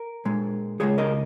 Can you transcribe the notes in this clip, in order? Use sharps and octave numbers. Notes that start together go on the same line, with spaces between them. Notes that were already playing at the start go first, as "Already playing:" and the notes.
Already playing: A#4
A#2 G#3
C#2 C#3 G#3 G#4 C#5
A#4 D#5